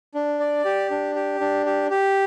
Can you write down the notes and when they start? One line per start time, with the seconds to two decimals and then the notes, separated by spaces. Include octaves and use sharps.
0.14 D4
0.40 D5
0.65 G4
0.91 D4
1.15 G4
1.41 D4
1.66 G4
1.90 G4